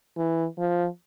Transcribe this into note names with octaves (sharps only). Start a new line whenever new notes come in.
E3
F3